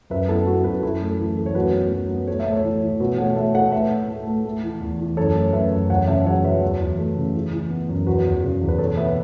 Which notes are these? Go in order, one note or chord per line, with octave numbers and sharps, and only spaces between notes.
F#2 B4 E5
B3 E4 A4
B3 F#4
F#2 F#4 B4
F#2 E4 A4
A3
E3
A3
C#5
F#2 F#4 B4
B3
F#3
B3
A3 C#5
E5
A2
A4 C#5
E3
E3
B2 F#4 B4
A3 C#5 F#5
A3 E5 A5
A3 C#5 F#5
A3 B4 E5
A2
A3
A3
A3
E3
E2
E3
F#2 A4 C#5
A3
F#2 B4 E5
F#2
E2 C#5 F#5
C#3 E5 A5
F#3 C#5 F#5
F#3 B4 E5
E2
E2
A3
C#3
E3
E3
B3
F#2
E2 F#4 B4
E2
C#3
E2
B4
B2 A4 C#5
B3 B4 E5